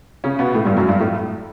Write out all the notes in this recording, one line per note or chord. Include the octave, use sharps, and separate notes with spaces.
C#3 C#4
B2 B3
A2 A3
G2 G3
F#2 F#3
G2 G3
A2 A3